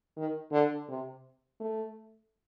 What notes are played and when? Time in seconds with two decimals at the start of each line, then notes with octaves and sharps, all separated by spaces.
0.17 D#3
0.52 D3
0.89 C3
1.60 A3